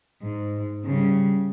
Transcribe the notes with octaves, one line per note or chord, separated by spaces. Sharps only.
G#2
C#3 G3